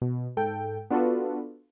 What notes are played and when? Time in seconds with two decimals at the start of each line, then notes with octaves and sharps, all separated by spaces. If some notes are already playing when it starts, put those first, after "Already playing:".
0.02 B2
0.37 G#2 A4 G5
0.90 B3 D4 F4 F#4 A4 B4